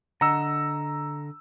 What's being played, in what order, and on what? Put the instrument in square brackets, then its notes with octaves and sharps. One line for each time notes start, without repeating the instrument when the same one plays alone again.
[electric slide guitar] D3 D#5 F#5 [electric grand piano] A#5 E6